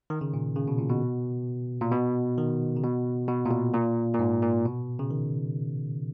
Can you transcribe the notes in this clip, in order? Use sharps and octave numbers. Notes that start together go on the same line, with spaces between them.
D#3
C#3
A#2
C#3
B2
A#2
B2
A#2
B2
D#3
C#3
B2
B2
A#2
B2
A#2
A#2
G#2
A#2
B2
C#3
D#3